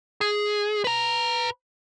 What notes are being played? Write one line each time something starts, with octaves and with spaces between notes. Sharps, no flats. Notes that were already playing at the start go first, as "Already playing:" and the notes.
G#4
B4 A#5